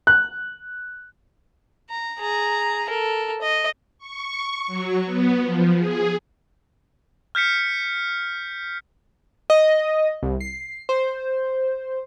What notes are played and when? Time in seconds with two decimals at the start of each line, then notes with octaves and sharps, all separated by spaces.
0.07 F#6
1.90 A#5
2.19 G#4 A#5
2.89 A4 A#4
3.41 D#5
3.98 C#6
4.67 F#3
5.05 B3
5.42 F3
5.77 G#4
7.35 F6 G6 B6 C#7
9.50 D#5
10.23 C2
10.41 C7
10.89 C5